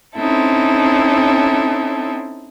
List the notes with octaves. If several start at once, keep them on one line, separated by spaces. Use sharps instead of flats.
C4 C#4 D#4 E4 A4